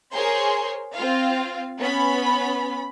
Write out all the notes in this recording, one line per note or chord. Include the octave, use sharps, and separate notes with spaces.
G#4 A#4 C5 C#5 C6
C4 F4 F5
B3 C#4 B5